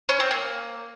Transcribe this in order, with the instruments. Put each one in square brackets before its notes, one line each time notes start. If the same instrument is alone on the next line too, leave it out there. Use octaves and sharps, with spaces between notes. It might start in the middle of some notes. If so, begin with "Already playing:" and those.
[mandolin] C#4
C4
A#3